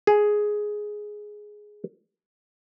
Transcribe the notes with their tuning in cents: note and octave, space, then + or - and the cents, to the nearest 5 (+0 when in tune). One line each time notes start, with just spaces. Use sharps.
G#4 +5